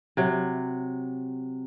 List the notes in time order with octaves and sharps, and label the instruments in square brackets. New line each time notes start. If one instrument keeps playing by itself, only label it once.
[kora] C3 F#3